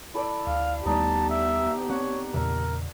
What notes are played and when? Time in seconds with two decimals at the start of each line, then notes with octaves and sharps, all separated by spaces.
0.14 E4 A4 D5
0.47 D2 F5
0.86 D#2 G3 A3 B3 D#4 G4 D5 A5
1.30 E5
1.90 C4 C#5 F#5
2.34 E2 A#2 C#3 A#4 E5